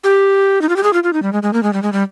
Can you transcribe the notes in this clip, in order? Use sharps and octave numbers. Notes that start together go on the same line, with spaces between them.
G4
D#4
F4
G4
G#4
F4
F4
D#4
G3
G#3
G#3
A#3
G#3
G3
G#3
G3